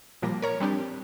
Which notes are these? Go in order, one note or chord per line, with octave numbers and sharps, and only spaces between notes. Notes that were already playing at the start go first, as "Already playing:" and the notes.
A#2 F3 G3 A#3 A#6
A#4 C#5 A#5
G3 C4 D4 G4